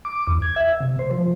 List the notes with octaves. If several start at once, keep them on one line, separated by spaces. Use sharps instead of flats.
D6
E2
G#6
E5
C3
C5
F3